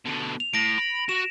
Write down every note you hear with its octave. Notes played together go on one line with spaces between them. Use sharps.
B2 D3
F7
A2 A#6 D7
B5
F#4 E7